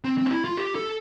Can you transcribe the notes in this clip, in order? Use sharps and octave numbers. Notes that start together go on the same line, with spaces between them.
C4
C4
D4
E4
F4
G4
A4